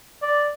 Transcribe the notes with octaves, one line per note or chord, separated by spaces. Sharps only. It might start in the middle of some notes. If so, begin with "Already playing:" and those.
D5